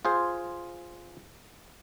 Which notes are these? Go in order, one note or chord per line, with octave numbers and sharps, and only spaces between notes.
F4 G#4 C5